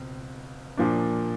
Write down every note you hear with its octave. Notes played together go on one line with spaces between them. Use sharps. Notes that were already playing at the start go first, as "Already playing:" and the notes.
Already playing: C#2 B2 C4
A#2 F3 A#3 D4